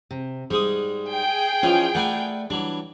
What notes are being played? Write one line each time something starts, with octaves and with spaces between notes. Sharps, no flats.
C3
G#2 G3 G#3 D#6
G#4 G5
E3 F3 C#4 F4 D#5
A3 A#4 B4 D5 F#5 G#5
E3 F#3 G3 D4